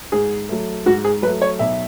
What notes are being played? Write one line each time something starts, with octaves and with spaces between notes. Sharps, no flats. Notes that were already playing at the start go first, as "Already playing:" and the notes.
G#2 G#4
F#3 A3
G#2 F#4
G#4
F#3 A3 B4
C#5
B1 E5